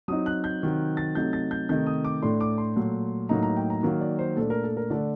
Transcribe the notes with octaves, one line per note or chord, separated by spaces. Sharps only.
F#3 C4 D#4 D#6
F#6
G6
C3 D#3 F#3 C4
A6
C3 F#3 A3 D#4 G6
A6
G6
C3 D#3 A3 D#4 G6
D#6
D6
A2 A3 D4 C6
D6
C6
A#2 F#3 A3
A2 F#3 A#3 D#4 A#5
A#5
G5
A#5
D#3 F#3 A#3
D5
C5
A#2 A3 D4 A4
A#4
A4
A#4
D3 A3 D4 D5